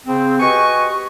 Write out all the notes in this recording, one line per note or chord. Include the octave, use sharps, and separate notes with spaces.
C#3 C4
F#4 G4 B4 D#5 G#5 C#6